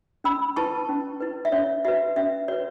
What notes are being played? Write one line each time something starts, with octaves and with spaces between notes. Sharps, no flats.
C#4 B5 E6
E4 B4 A5 C#6
C#4
E4 B4
E5
C#4 C#5
F#4 B4 E5
C#4 E5
F#4 B4 C#5